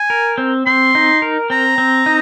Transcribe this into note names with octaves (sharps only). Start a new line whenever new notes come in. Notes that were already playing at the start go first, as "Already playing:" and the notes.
Already playing: G#5
A#4
C4
C4 C6
D#4
A#4
C4 A#5
C4
D#4